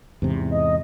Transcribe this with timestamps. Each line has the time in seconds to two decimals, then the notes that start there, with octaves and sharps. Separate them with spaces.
0.22 E2 G#2 C3
0.51 D#5